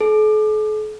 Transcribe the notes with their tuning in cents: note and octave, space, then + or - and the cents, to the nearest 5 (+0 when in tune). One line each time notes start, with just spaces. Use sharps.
A4 -45